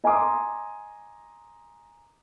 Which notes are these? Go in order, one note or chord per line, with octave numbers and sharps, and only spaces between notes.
D#5 G#5 A#5 C6 D6 D#6